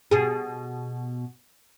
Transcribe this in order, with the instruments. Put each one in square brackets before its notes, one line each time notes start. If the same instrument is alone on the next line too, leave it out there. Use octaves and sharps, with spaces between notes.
[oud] B2 G#4